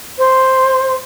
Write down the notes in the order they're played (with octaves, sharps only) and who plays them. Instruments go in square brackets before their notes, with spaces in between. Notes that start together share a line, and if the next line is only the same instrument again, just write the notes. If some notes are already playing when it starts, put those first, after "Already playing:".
[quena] C5